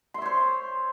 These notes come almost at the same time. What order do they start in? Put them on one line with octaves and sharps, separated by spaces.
C6 E5 C#5 C5